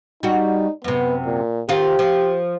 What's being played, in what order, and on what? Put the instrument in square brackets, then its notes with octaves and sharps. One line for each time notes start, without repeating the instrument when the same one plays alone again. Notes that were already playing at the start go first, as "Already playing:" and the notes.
[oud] G3 F#4 [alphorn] D#4
[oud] F#2 C3 [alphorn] B3
[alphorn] A#2
[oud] D#3 C4 F4 [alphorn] G4
[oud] F3